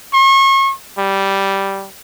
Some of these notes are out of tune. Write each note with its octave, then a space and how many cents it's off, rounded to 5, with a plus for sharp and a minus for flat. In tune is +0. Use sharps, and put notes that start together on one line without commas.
C#6 -35
G3 -5